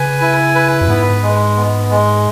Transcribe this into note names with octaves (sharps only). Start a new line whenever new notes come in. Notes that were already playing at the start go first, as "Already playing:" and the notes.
Already playing: C#3 B4 G#5
E4
B4
F#2
G#2 B3
G#3
B3
G#3